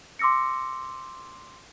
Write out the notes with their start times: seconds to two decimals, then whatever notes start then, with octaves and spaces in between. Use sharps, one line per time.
0.19 C6 D6 E6 A#6 C#7